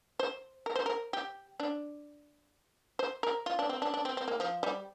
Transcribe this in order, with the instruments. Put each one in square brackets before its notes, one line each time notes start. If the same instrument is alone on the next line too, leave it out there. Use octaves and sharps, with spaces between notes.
[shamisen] C5
A#4
C5
A#4
G4
D4
C5
A#4
F4
D4
C4
D4
D4
C4
C4
A#3
F3
G3